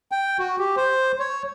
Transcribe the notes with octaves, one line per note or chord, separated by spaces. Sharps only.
G5
F#4
G4
C5
C#5